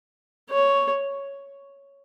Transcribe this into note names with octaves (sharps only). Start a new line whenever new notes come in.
C#5